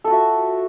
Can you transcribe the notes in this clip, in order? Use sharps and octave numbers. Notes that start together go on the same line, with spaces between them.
F4 F#4 A4 E5